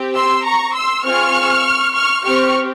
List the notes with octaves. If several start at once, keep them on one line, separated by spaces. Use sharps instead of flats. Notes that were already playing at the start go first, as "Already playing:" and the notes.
Already playing: C4 G4
C6 E6
A#5 C#6
C6 E6
C4 F4 G#4 C#6 F6
C#6 F6
C4 G4 C#6 F6